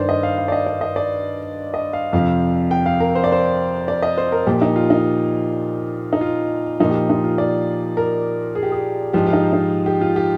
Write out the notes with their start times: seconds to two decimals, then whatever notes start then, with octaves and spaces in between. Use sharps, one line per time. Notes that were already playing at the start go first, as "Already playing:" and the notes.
Already playing: G2 D#3 C5 D5
0.09 D#5
0.23 F5
0.38 F5
0.48 D5
0.52 D#5
0.66 D5
0.81 D#5
0.96 D5
1.74 D#5
1.93 F5
2.13 F2 C3 F3 F5
2.71 G5
2.86 F5
3.00 A#4
3.15 C5
3.24 D5
3.32 C5
3.88 D5
4.02 D#5
4.18 C5
4.32 A#4
4.47 A#2 F3 G4
4.62 D#4
4.76 F4
4.90 D#4
6.13 D#4
6.21 F4
6.80 A#2 F3 D#4
6.90 G4
6.95 F4
7.10 D#4
7.24 F4
7.38 D5
7.97 A#4
8.55 G#4
8.63 G4
8.72 G#4
9.13 G#2 F3 G4
9.26 F4
9.33 D#4
9.53 D#4
9.86 G4
10.01 F4
10.16 G4